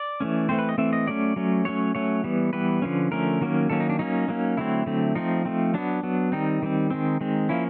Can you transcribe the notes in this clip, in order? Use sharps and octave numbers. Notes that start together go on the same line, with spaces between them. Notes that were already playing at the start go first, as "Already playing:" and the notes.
Already playing: D5
E3 A3 C#4
E3 A3 C4 C5
B4
D#5
E3 A3 C4 E5
D#5
F#3 A3 C#4 D5
F#3 A3 C#4
F#3 A3 C#4 C#5
F#3 A3 C#4 C#5
E3 G3 B3
E3 G3 B3 B4
D3 F3 A3 C#4
D3 F3 A3 C#4 A#4
D#3 F#3 A#3 C#4
D#3 F#3 A#3 C#4 A4
D#4
D4
F#3 A#3 C#4 D#4
F#3 A#3 C#4
D3 F#3 A3 C4 E4
D3 F#3 A3 C4
F3 A3 C4 D#4
F3 A3 C4
F#3 B3 D4
F#3 B3
D#3 G3 C4 D#4
D#3 G3 C4
D#3 G#3 C4
D#3 G#3 C4
F3 A#3 C#4 E4